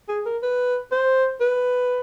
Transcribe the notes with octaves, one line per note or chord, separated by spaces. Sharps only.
G#4
A#4
B4
C5
B4